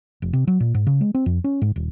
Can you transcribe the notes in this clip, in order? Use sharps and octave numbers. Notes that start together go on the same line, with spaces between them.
F1
C3
F#3
A#2
G#2
C#3
G#3
C4
F2
C#4
G#2
D#1